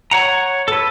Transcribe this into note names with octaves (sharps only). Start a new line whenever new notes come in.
C#5 F#5 A#5
A4 B4